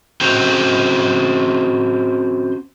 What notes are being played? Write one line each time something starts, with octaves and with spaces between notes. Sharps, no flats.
C4 C#4 F#4 C5 G5 A#5